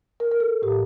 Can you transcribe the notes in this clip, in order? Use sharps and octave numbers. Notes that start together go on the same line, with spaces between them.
A#4
A#4
A4
A2 G4